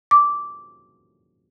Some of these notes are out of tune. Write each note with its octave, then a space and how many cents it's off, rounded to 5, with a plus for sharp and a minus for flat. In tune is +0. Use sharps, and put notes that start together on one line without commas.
D6 -10